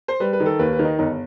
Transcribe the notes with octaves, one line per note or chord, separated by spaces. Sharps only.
C5
G3 B4
B4
D#3
A4
D#2 B4
B4
D#3
D#4
G1 D#4